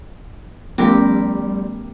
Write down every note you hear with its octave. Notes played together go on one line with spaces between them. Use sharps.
F3 G3 A3 B3 C#4 G4 A#4